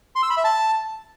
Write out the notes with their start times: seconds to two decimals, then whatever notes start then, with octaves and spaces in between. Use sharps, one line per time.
0.16 C6
0.23 E6
0.30 B5
0.37 E5
0.44 A5